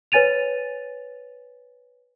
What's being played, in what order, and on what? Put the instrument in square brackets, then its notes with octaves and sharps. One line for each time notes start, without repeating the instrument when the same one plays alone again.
[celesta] B4 C#5 G#5 A6 D#7 F7